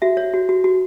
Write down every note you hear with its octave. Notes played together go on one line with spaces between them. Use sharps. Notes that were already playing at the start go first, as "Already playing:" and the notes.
F#4 E5
C#5
F#4
F#4
F#4